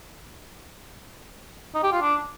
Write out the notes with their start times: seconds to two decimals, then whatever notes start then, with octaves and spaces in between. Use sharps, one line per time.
1.74 D#4
1.83 G4
1.92 F4
2.01 D4